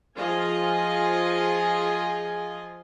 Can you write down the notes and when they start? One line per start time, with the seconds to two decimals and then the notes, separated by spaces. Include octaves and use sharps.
0.17 F3 F4 G#4 D#5 G#5